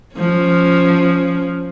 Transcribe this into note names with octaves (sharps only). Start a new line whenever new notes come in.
F3 C#4